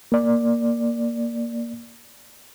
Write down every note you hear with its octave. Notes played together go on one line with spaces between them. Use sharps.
A#3 D5